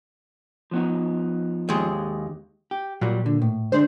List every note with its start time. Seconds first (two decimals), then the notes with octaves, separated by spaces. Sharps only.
0.71 F3 B3 D#4
1.69 D#2 G#3
2.71 G4
3.01 A#2 F#3 G3
3.26 D3
3.42 A2
3.72 D3 G#3 D4 C5